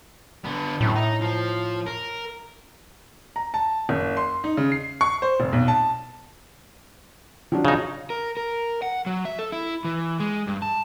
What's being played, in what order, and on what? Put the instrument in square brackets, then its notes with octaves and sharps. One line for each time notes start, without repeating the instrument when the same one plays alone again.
[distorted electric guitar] D3 B3
[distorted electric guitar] F#2 D3 [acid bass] A2
[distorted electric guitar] D#4
F3
A#4
[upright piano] A#5
A5
F#1
C6
D#4
C#3
C7
C#6
C5
F1
B1
A5
[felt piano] F3 F#3 D4
[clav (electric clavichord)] C#3 D#4
[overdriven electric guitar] A#4
A#4
F#5
F#3
E5
A4
E4
E3
G#3
G2
A5